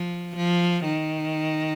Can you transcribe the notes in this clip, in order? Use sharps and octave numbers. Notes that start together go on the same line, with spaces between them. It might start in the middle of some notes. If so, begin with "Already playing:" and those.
Already playing: F3
F3
D#3